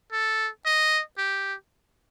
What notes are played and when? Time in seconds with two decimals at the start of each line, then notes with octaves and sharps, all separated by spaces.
0.13 A4
0.66 D#5
1.18 G4